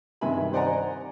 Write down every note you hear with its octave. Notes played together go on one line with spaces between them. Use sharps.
G2 C3 D#3 E5 G#5 B5
C5 D5 D#5 F#5 G#5 A#5